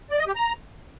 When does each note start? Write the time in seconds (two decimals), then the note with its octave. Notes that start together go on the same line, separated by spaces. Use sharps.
0.10 D5
0.19 D#5
0.27 G4
0.35 A#5